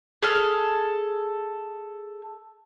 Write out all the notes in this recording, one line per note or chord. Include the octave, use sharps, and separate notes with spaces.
G#4 A4 F6